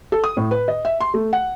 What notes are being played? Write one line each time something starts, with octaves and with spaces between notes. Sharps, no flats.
A4
D#6
A2
B4
D#5
E5
C6
A3
F#5